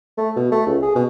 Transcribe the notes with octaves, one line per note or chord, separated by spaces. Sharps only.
A3
B2
A3
C#2
G#4
B2